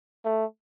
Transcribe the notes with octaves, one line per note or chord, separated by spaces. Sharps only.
A3